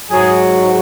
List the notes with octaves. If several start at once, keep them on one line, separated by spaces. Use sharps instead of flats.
G#2 F#3 G#4